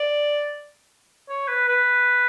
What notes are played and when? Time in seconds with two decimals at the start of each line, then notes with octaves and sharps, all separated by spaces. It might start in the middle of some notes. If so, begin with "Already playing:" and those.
Already playing: D5
1.29 C#5
1.48 B4
1.68 B4